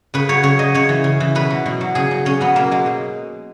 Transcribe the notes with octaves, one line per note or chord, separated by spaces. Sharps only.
C#3 B4
F#3 C#5
C#3 C#5
F#3 D#5
C#3 C#5
E3
C#3
E3
B2 B4
F#3
B2
F#3
C#3 G#4
F#3
C#3 C#4
F#3 B3
B2 A#3
F#3 G#3
B2